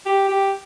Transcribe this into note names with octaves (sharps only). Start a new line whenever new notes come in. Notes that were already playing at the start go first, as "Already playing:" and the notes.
G4
G4